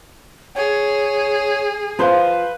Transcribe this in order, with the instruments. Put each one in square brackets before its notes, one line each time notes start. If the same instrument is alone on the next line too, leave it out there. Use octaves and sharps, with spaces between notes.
[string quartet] G#4 [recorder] C#5
[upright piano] F3 C5 F5 [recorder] B4